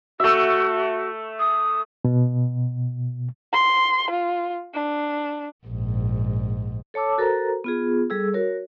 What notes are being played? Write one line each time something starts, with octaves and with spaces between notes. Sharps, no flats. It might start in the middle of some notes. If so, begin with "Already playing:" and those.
A3 F#4 E5
D#6
B2
C6
F4
D4
A#1 G#2
A4 C#5 A5 D6 E6
F#4 A4 A#4 C5 A#5
B3 F4 G#4
G3 G#4 A4 E6
F#4 A#4 C#5